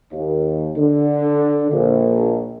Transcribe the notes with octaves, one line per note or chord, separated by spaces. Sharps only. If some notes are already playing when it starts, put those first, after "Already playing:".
D#2
D3
A#1